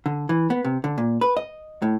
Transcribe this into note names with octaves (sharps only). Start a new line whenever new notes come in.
D3
E3
B3
C3
D3
A#2
B4
D#5
A2